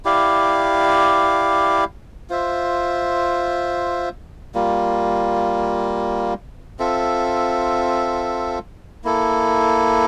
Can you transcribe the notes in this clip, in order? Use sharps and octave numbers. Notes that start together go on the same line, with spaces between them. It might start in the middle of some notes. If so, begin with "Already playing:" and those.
E4 G4 D5 F5
F4 C5 E5
G3 A#3 F4
C4 F4 A4 E5
A#3 E4 A4